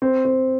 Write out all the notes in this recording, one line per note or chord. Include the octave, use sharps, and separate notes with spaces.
C4
C4